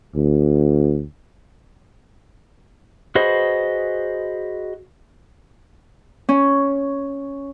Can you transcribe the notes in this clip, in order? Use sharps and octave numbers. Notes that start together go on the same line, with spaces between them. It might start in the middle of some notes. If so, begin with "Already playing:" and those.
D2
F#4 G#4 B4 C5 D#5
C#4